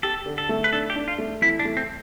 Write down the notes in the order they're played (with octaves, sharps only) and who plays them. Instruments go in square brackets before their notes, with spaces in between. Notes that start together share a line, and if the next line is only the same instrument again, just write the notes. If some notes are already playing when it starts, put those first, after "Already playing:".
[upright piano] G4 [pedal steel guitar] A4
[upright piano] D3
[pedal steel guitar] A4
[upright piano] A3
[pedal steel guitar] B4
[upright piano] D4 [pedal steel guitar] A4
[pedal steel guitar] G4
[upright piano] D4
[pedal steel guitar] F4
[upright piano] A3
[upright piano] E3 [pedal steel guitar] E4
[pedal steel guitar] D4
[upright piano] A3
[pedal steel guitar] C4